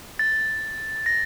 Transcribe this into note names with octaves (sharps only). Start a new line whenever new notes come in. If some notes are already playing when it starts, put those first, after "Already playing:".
A6
A#6